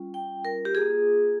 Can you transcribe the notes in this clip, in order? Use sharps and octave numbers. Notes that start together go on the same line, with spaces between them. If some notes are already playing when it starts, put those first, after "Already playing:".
Already playing: G3 C#4 F4
G5
A#4
G4
A#3 F4 G#4